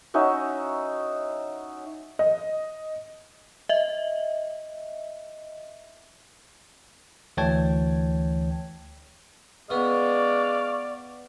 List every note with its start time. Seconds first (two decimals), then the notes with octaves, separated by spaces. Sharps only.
0.14 C#4 D#4 F#4 E5
2.19 D#5
3.69 D#5 E5
7.37 D2 E3 C#5 G5 A5 G#6
9.70 G#3 B3 D5 F5 C#6